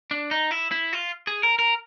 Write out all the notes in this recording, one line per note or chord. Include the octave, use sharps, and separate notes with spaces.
D4
D#4
E4
E4
F4
G#4
A#4
A#4